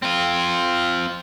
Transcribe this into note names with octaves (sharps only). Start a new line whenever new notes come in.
C4 F4